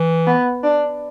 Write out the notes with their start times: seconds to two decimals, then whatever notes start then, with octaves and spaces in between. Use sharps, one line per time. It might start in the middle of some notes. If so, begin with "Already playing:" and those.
Already playing: E3
0.27 B3
0.63 D4